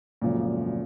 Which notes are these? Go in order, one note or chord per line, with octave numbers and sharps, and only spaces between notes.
G#1 F#2 A#2 C#3 F3 A3